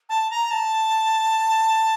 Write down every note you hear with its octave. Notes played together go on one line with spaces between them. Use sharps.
A5
A#5
A5